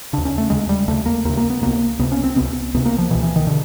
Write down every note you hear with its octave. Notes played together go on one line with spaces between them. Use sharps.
D#2 C#3 D4
C#4
A3
D#2 C#3 G#3
G3
D#2 C#3 A3
A#3
D#2 C#3 A#3
A#3
B3
C#2 C3 A#3
C#2 C3 B3
C#4
C4
C#2 C3 B3
C#2 C3 B3
A#3
F3
C#2 B2 E3
E3
D#3
B2 D3